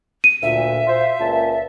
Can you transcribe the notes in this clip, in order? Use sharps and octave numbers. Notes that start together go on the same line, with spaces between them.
D#7
D2 A#2 E5
F4 C5
C#2 A#2 A5